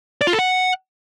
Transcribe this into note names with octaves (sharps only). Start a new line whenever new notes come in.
D5
F4
A4
F#5